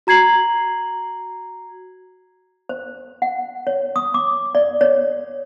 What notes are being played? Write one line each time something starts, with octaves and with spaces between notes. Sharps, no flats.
F#4 A#5 G#6 C7 F#7
C5
F#5
C#5
D#6
D6
D5
C#5